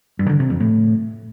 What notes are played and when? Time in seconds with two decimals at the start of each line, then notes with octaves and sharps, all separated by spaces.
0.19 G2
0.30 D3
0.40 C3
0.50 F2
0.60 A2